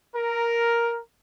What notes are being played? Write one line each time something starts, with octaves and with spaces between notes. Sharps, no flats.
A#4